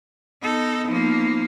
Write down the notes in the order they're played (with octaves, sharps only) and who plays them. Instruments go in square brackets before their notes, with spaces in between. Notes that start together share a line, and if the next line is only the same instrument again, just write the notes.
[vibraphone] B3 [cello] D#4 A4
[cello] F3 A#3 [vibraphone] B3 D#4